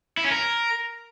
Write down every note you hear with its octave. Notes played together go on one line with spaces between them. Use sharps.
E4
C#4
A#4